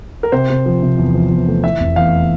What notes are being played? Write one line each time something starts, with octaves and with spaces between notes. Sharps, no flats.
A#4
C3 C5
C3
F3
C3
E2
F3
E2
A3
E3 E5
F1
E2 F5